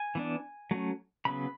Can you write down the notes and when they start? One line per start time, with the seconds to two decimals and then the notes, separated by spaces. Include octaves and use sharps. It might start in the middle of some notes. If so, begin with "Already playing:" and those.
Already playing: G#5
0.15 E3 B3 D4
0.71 F#3 A3 C#4
1.25 C#3 F#3 B3 B5